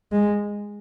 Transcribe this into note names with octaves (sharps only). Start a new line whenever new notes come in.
G#3